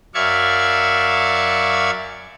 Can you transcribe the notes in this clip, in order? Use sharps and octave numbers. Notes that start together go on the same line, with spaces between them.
F#2 D5 E5 F5 C#6 G#6